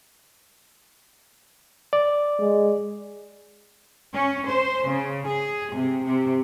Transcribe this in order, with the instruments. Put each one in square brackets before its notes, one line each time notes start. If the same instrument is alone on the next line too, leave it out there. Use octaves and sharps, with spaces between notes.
[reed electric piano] D5
[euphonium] G#3
[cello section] C#4
C5
C#3
G#4
C3
C3